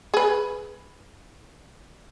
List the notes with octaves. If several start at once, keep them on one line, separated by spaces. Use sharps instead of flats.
G#4 B4